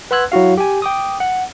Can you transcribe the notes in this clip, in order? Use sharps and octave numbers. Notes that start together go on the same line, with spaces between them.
B4 F#5 C6 E6 F#6 G#6
F#3 E4 F#4 F5
G4 G#5
G5 D6 D#6
F#5